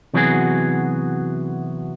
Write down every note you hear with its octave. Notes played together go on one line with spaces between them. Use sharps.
C3 E3 F#3 B3 F#4 G#4